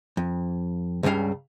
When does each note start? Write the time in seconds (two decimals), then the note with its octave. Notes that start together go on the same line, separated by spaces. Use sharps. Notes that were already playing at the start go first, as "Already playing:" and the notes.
0.17 F2
1.03 C#2 G2 C#3 G3 F5